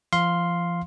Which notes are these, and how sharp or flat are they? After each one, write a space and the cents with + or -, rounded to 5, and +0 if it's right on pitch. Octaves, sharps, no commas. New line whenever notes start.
F3 -30 F5 +0 C6 +0